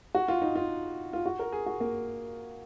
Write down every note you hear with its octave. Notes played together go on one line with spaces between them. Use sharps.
F#4
F4
D#4
F4
F4
F#4
A#4
G#4
F#4
A#3